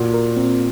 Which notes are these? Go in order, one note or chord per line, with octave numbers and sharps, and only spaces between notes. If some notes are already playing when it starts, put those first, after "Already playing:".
Already playing: A#2 F#4
A#4
C4